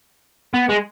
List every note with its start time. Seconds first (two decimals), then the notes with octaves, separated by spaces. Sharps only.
0.54 B3
0.69 G#3